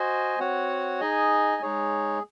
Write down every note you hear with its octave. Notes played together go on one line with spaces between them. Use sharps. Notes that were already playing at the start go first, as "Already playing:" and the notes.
Already playing: F#4 C5 D#5 G#5
C4 F#4 C#5 F#5
D#4 G#4 D#5 G#5
G#3 D#4 G#4 C#5